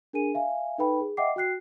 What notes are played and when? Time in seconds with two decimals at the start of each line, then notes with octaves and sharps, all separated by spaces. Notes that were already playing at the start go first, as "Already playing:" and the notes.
0.13 D4 G#4 A#4 G#5 D#7
0.34 E5 F5 G#5
0.78 D#4 A4 B4 G5 B5
1.01 G#4
1.17 D#5 E5 F#5 G5 D6 C7
1.36 F#4 G5 F#6 C7